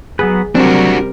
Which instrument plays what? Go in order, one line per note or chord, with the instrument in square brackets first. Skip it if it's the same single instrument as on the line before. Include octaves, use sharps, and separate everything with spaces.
[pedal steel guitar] F#3 B3 B4 [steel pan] G#4
[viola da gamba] C3 G3 A#4 [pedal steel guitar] F#3 [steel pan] C4 [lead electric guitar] D4 F#4